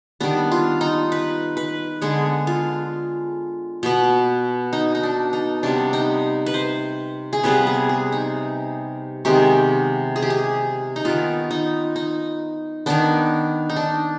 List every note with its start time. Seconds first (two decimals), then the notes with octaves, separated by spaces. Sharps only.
0.20 D#3 G3 B3 D4
0.52 F4
0.81 D#4
1.12 B4
1.57 B4
2.02 D3 G#3 B3 G#4
2.47 F4
3.83 B2 B3
4.73 D#4
4.95 D#4
5.03 D4
5.33 D#4
5.63 C3 G3 B3 D4
5.93 D#4
6.46 B4
6.54 C5
7.33 G#4
7.43 C3 G3 B3 B4
7.67 G#4
7.89 G#4
8.12 D#4
9.25 C3 D#3 G#3 B3 G4
10.16 G#4
10.22 G4
10.30 G#4
10.96 D#4
11.05 D#3 B3 F4
11.51 D#4
11.96 D#4
12.86 D#3 B3 D4
13.70 D#4
13.76 D4